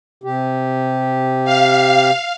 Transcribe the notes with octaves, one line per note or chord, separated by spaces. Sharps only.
C3 G4
F5